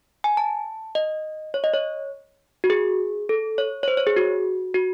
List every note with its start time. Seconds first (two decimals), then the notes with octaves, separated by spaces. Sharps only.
0.24 G#5
0.37 A5
0.95 D#5
1.54 C#5
1.64 D#5
1.73 C#5
2.64 F#4
2.70 G#4
3.29 A4
3.58 C#5
3.83 C#5
3.88 C5
3.97 C#5
4.07 G#4
4.16 F#4
4.74 F#4